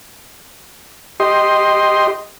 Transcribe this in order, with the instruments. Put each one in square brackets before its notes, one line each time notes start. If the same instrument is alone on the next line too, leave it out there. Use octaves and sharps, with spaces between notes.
[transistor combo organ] G4 D#5 C6